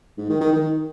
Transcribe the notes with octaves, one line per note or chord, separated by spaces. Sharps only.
G#2
D#3
D#3
D#3